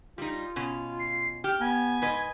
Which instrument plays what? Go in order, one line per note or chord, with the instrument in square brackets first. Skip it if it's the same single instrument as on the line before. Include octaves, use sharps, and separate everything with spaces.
[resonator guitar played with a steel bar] G3 D#4 [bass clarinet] F4
[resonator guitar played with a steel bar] B2 C#4
[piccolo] C7
[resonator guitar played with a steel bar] G4 [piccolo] F6
[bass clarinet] B3 [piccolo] G#5
[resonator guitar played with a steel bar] G#2 B4 D#5